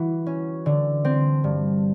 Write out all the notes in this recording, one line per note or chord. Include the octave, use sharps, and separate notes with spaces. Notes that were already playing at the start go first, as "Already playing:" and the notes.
Already playing: E3 F#4
C#4
D3
C4
G2